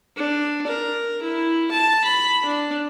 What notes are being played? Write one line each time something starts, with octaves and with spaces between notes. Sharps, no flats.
D4
A#4
E4
A5
B5
D4